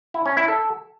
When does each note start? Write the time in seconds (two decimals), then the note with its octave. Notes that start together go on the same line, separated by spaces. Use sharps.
0.14 E4
0.26 C#4
0.37 E4
0.48 A4